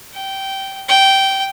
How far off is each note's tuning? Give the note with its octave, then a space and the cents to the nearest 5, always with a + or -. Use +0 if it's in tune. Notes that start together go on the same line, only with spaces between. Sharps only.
G5 -15
G5 -15